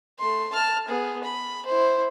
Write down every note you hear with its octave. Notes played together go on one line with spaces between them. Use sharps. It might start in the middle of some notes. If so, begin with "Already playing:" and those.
A3 C6
A5 F6
B3 G#4
B5
E4 C5